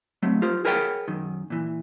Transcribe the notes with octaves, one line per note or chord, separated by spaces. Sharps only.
F#3 A3 C4
F4 G4 C5
G#4 A#4 B4 C#5 F#5 G5
F#2 D#3
A#2 E3